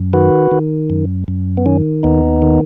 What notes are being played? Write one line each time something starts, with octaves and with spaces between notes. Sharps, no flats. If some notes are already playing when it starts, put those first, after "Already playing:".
Already playing: F#2
D#3 F#4 B4
D#3
F#2
F#2
B3
D#3 C#4
D#2 B3 D#4
D#3